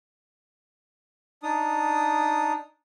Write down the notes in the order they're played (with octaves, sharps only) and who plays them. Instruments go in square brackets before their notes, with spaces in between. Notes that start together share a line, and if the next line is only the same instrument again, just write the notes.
[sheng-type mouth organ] D4 D#4 D#6